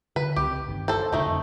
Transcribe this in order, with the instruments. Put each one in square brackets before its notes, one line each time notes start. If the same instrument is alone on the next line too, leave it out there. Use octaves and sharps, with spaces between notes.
[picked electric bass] D3 [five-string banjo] B4
[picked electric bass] C#2 F3 C4 [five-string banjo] G4
[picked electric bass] G1 B2 D#3
[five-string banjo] A4 C5
[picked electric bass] E1 D3 [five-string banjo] D#3 A3 D#4
[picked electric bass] F2 C#3